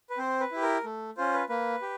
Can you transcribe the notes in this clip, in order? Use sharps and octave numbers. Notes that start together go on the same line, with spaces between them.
B4
C4 C5
B4
E4 G4
A#4
A3
C#4 F4 C5
B4
A#3 B4
G4